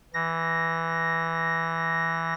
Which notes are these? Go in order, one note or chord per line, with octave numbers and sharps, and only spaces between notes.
E3 A#6